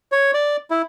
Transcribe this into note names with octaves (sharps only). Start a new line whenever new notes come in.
C#5
D5
E4